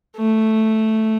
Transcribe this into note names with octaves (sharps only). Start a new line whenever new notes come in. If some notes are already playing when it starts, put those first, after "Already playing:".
A3